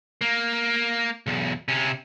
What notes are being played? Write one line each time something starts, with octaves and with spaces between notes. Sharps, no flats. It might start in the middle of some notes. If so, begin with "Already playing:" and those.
A#3
B1 E2
C3 C#4